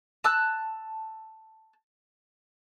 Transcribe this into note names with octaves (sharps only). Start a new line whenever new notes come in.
A5 E6 F#6